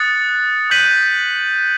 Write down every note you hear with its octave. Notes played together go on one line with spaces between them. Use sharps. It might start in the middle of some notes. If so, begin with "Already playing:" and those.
Already playing: D#6 F#6 A6 C#7
D#6 G6 B6 D#7 F#7